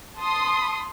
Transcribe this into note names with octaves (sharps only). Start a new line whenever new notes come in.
A5 C6 D#6